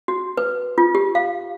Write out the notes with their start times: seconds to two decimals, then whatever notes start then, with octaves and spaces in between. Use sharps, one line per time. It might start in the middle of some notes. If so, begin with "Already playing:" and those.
0.08 F#4
0.37 B4
0.78 F4
0.95 G4
1.15 F5